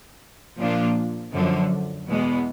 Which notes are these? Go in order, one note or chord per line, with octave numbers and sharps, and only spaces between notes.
A#2 F3 A#3 D4 F4
F#2 D3 F3
E2 B2 G#3 B3